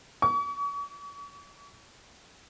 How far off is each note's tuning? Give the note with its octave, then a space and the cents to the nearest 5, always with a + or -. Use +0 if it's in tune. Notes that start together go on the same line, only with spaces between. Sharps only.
C#6 +40